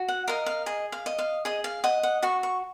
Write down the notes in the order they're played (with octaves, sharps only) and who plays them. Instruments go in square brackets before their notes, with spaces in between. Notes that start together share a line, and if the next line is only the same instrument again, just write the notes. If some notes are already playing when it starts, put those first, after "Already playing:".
Already playing: [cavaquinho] F#4
F#5
A#4 D#5 F5
F5
G#4 D#5
F5
D#5
F5
G#4 D#5
F5
D#5 F#5
F#5
F#4 C#6
C#6